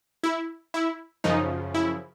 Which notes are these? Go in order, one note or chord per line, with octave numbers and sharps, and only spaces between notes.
E4
E4
F#2 C#3 F3 D#4
E4